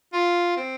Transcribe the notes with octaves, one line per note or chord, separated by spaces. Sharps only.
F4
C4